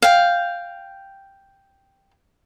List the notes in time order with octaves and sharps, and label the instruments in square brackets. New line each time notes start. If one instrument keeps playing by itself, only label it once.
[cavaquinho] F5 G5